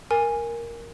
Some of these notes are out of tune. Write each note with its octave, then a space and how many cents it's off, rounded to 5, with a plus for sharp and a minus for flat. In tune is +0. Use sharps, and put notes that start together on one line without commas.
A#4 +0 G#5 -10